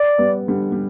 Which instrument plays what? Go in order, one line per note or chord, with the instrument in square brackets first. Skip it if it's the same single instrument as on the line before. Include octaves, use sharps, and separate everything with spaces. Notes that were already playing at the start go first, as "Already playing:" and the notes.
Already playing: [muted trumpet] D5
[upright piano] G3 B3
D3 G3
G3